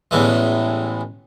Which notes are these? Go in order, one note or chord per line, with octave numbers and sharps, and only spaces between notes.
A1 E2 A2 E3 G#3